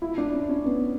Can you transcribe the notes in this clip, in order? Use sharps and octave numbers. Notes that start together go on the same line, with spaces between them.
E4
D4
C#4
C#4
B3